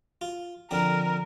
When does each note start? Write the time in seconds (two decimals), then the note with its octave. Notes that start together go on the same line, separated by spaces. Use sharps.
0.21 F4
0.71 F2 D3 C4 A#4